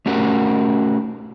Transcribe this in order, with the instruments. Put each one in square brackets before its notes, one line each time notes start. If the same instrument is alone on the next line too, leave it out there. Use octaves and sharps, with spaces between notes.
[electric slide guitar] A3 C#4 F#4 G4 A#4